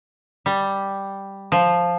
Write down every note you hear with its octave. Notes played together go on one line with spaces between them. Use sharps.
G3
F3